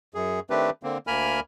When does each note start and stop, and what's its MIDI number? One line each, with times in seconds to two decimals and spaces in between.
0.14 0.40 42
0.14 0.40 68
0.50 0.70 51
0.50 0.70 57
0.50 0.70 60
0.50 0.70 62
0.50 0.70 67
0.50 0.70 71
0.83 0.98 50
0.83 0.98 58
0.83 0.98 60
1.07 1.40 38
1.07 1.40 58
1.07 1.40 70
1.07 1.40 80
1.07 1.40 83
1.07 1.40 89